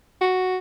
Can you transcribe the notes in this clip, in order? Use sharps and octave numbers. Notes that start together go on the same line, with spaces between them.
F#4